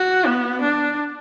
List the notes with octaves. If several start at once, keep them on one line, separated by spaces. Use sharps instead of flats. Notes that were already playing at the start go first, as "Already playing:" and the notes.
Already playing: F#4
B3
D4